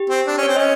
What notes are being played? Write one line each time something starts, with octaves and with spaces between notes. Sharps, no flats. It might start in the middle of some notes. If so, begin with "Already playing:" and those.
Already playing: G4
C4
D4
C#4
C4 C#5
C#4 D#5